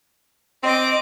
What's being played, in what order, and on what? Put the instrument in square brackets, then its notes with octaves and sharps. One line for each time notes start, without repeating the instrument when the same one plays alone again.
[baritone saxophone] C4 [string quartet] D#5 D6